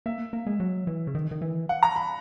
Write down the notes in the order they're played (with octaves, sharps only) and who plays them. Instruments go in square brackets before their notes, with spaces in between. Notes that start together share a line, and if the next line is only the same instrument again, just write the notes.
[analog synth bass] A#3 [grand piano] E5
[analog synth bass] A#3
G#3
F#3
E3
C#3
D#3
D#3
E3
[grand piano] F#5
A#5
B5